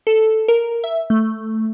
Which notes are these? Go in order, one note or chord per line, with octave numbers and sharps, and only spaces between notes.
A4
A#4
E5
A3